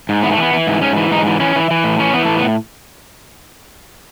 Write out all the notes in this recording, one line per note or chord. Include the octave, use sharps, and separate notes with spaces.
G#2
E3 B3
A3
E3 B3
E3
G#2
G#2 C#4
E3
G#2 D#4
E3
E3 C#4
E3
E3
A2
E3 C#4
E3 B3
A2 A3
B3